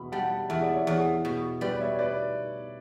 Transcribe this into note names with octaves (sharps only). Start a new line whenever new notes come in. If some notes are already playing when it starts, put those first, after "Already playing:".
Already playing: E2 B2 B5
G3 F#5 A5
E2 E5
D5
C#5 E5
E2
B2
G3 B4 D5
C#5 E5
B4 D5